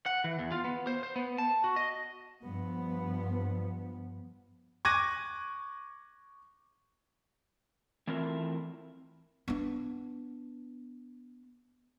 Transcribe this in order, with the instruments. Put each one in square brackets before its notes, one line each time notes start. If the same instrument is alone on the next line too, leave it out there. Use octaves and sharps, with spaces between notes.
[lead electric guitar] F#5
E3
E2
F4
B3
C5
C5
B3
A5
F#4
D#5
[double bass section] G2 F3 B3
[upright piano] C#6 D6 F#6 G#6 A#6 D#7
[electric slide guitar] E3 A3 C4 E4 F4 A#4
[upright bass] B3 D4